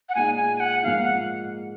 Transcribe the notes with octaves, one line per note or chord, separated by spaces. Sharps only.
F#5
A#2 G#3 D#4 G#5
G#5
G#5
F#5
G#2 F3 A#3 D#4 F5
F#5